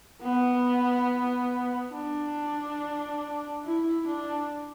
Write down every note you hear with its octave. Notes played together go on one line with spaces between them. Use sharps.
B3
D4
E4
D4